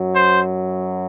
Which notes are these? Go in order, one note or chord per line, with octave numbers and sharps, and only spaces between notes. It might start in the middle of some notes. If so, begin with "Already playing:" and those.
Already playing: F#2 F#3
C5